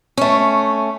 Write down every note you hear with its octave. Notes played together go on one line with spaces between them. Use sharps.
A3 C#4